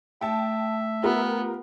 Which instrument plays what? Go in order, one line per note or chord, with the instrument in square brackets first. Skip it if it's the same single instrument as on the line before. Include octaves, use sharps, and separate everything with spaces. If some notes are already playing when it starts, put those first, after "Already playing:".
[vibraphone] A3 [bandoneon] E5 [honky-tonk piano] G5 A5
[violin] B3 [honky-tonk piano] F4 G4 A#4